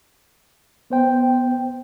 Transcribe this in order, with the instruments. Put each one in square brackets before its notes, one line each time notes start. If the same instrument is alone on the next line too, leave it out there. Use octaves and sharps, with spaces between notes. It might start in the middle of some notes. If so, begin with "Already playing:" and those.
[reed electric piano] B3 C5 G5